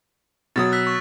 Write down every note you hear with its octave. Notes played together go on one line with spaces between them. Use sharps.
B2 F#3 D#6 A6
E6 F#6 B6
C#6